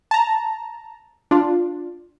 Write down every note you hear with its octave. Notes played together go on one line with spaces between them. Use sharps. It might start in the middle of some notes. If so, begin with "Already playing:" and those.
A5 A#5
D4 F4